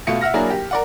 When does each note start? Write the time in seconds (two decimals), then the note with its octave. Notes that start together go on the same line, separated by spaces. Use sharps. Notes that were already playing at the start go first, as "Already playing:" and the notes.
0.07 B2 A3 F4 C#7
0.21 E5 F#5 F6 A#6
0.34 F#3 A#3 D4 E4 G#4 A#4
0.50 G4
0.71 A#4 D5 F#5